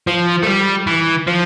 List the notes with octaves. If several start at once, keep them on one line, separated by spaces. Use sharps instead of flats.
F3
A3
G3
E3
F3